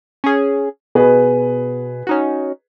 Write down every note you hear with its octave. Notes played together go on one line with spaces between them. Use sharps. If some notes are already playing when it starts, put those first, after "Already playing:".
C#4 G#4
B2 G#4 B4
C#4 D#4 F#4